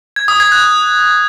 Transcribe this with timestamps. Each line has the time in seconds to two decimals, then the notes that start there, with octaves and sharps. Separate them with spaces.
0.16 G#6
0.28 D#6
0.40 G#6
0.52 F#6